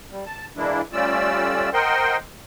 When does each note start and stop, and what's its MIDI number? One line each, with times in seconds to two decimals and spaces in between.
0.11 0.25 55
0.26 0.47 81
0.56 0.82 52
0.56 0.82 56
0.56 0.82 58
0.56 0.82 62
0.56 0.82 64
0.93 1.70 55
0.93 1.70 57
0.93 1.70 61
0.93 1.70 65
0.93 1.70 74
0.93 1.70 88
1.73 2.17 70
1.73 2.17 72
1.73 2.17 75
1.73 2.17 78
1.73 2.17 79
1.73 2.17 84